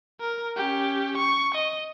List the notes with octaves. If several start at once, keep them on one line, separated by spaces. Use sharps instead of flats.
A#4
C#4 G4
C#6
D#5